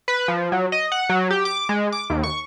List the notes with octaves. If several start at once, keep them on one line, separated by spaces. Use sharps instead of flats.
B4
F3
F#3
D#5
F#5
F#3
G4
D6
G#3
D6
D#2
C#6